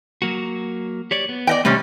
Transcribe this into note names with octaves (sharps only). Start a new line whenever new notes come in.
F#3 A#3 F#4
G4 C#5 D5
B3
D5 D#5 G5
C3 G3 A3 C#4